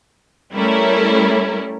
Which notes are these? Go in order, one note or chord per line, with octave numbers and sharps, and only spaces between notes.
G3 A3 C#4 E4 A#4